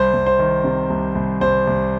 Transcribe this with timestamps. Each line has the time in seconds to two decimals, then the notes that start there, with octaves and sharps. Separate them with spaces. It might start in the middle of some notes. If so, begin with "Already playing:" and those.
Already playing: C2 C5
0.13 C2
0.26 C5
0.39 D#3
0.64 C3
0.90 C2
1.15 C2
1.41 C2 C5
1.67 C2